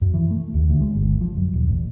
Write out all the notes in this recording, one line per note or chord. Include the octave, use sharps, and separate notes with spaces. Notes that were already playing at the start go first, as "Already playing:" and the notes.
F#2
E3
A3
D#2
D2
G#3
G1
F3
F#2
D#1
A1